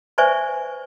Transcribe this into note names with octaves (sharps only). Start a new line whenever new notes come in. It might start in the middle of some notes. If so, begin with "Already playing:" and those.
B4 C5 D5 E5 G#5 C#6